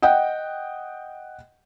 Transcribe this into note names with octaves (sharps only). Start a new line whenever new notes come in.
D#5 F#5 G5